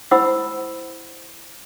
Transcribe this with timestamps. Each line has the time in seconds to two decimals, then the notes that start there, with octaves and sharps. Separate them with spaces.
0.11 E4 C5 F#5 B5 D#6 E6